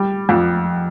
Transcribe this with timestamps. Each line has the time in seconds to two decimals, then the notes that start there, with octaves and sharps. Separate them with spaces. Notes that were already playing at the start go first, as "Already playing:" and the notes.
Already playing: G3
0.29 F2